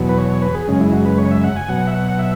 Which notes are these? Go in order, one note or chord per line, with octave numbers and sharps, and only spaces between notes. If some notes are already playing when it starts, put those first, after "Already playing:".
Already playing: E2 B2 F#3
B4
C#5
C#5
B4
G#4
F#2 C#3 G#3 C#4
E4
F#4
B4
C#5
E5
F#5
G#5
B2 F#3 F#5
E5
F#5
E5